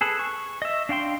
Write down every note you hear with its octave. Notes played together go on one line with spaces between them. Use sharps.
G#4 A4 B4
C#6
D#5 E5
D4 F5 G5 C6